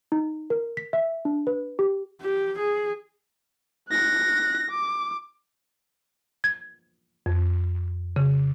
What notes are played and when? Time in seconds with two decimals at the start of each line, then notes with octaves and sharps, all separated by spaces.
0.12 D#4
0.50 A#4
0.77 B6
0.93 E5
1.25 D4
1.47 B4
1.79 G4
2.22 G4
2.58 G#4
3.90 F#6 A#6
4.70 D6
6.44 G#6
7.26 F2
8.16 C#3